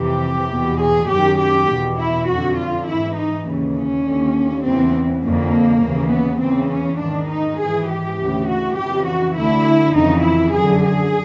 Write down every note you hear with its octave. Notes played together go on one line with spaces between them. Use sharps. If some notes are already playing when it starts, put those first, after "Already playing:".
Already playing: F2 C3 E3 G4
E2 B2
G#4
F#2 D#3 G4
G4
E2 B2
E4
F2 D3 F#4
F4
G#2 E3 E4
D#4
D#2 C#3 E3
C#4
D#2 D3
E2 C#3 E3 C4
F2 D3 A#3
D#2 C#3 E3
B3
E2 C#3 E3 C4
C#4
G#2 D#3 D4
D#4
G#2 E3 G#4
G4
D2 C#3 E3
F#4
F2 C#3 E3 G4
F#4
D2 D3 E4
F2 C#3 E3 D#4
E4
F#2 D3 G#4
G#4